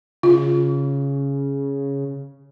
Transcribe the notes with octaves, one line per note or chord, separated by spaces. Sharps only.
C#3 F4